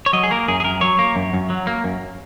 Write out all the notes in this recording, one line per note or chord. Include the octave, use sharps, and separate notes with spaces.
C#5
F#3 D#5
G#4
A#3 A#4
F#2 G#4
G#4
F#2 A#4
F#3 C#5
A#3
F#2
F#2
F#3
A#3
F#2